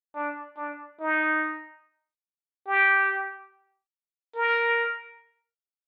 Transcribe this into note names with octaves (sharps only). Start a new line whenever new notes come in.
D4
D4
D#4
G4
A#4